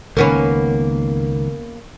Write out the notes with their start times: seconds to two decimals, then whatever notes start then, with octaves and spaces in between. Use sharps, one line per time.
0.17 C#2 D#3 A#3 B3 C#4